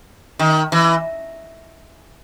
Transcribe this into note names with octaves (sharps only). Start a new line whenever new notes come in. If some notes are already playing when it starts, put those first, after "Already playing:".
D#3
E3